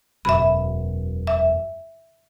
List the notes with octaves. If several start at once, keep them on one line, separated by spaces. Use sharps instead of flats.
E1 F#2 B2 E5 B5
E5